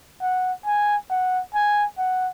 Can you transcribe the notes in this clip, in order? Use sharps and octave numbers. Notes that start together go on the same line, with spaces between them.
F#5
G#5
F#5
G#5
F#5